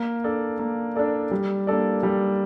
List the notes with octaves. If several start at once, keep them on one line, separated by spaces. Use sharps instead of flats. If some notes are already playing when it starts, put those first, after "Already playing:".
Already playing: A#3
D4 A4 D5
A#3
D4 A4 D5
G3
A#3 D4 A4 D5
G3